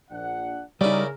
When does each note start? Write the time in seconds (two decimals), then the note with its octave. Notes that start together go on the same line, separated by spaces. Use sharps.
0.11 A#1 D4 F#5
0.81 C#3 G3 D#4 E4 G#4 A#4 D5